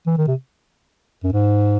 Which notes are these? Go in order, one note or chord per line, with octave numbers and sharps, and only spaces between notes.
E3
D#3
C3
F#2
G#2